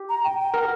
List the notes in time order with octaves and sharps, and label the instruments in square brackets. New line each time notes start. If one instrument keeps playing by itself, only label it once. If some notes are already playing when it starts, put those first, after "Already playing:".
Already playing: [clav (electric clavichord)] G4
[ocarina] A#5
G5
G5
[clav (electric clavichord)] A#4 [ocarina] F#5